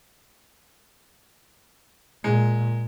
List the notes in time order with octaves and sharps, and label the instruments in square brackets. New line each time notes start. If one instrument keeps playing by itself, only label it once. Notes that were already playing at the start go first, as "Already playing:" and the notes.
[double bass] A#2 [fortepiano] G#3